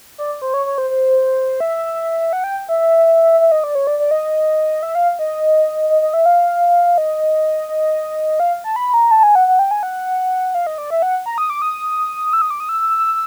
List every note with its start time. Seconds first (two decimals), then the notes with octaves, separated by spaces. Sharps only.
0.18 D5
0.42 C5
0.54 C#5
0.66 C#5
0.78 C5
0.90 C5
1.60 E5
2.33 F#5
2.44 G5
2.69 E5
3.40 E5
3.52 D#5
3.64 D5
3.75 C#5
3.87 D5
3.99 D5
4.11 D#5
4.83 E5
4.95 F5
5.19 D#5
5.90 D#5
6.02 D#5
6.14 E5
6.26 F5
6.98 D#5
7.69 D#5
8.40 F5
8.64 A5
8.76 B5
8.94 A#5
9.11 A5
9.23 G#5
9.35 F#5
9.48 F#5
9.59 G5
9.71 G#5
9.83 F#5
10.55 F5
10.67 D#5
10.78 D5
10.90 E5
11.02 F#5
11.26 A#5
11.38 D#6
11.50 D6
11.62 D#6
12.33 E6
12.42 D#6
12.51 D6
12.60 D#6
12.69 E6